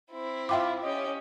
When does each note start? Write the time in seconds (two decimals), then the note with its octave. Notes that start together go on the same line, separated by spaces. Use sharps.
0.11 C4 E4
0.49 F4 E5 G5 D6
0.83 C#4 G4 D#5